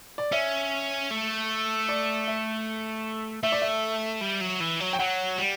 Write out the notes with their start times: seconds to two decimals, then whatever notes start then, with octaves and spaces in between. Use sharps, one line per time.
0.18 D5
0.32 C#4 E5
1.11 A3
1.89 D5
2.28 E5
3.43 A3 E5
3.52 D5
3.62 E5
4.21 G3
4.41 F#3
4.61 E3
4.80 F#3
4.93 G5
4.99 F#3 F#5
5.38 G3